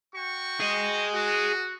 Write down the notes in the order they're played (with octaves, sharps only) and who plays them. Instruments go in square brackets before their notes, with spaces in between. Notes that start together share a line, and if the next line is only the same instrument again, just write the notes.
[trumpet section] F#4 G5 C#6
[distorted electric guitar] G#4 D#5
[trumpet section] F#4